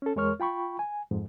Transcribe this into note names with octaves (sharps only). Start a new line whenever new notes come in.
C#4 A4
E2 G#3 A#4 C#5 C#6 F6
F4 G5 B5 C#6
G#5
F2 G#2